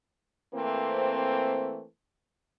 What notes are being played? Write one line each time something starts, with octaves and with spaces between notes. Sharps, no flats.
E3 A3 A#3 C4